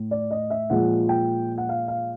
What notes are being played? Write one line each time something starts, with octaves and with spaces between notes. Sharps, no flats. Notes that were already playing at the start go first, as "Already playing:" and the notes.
Already playing: A2
D5
D#5
E5
A#2 F3 G#3 F#5
G5
F#5
F5
F5